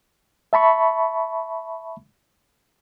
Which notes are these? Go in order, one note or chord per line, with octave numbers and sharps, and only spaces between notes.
E5 A5 B5 C#6